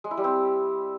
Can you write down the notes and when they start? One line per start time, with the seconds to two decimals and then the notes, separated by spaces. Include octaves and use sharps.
0.04 G#3
0.11 E4
0.17 G3
0.24 C4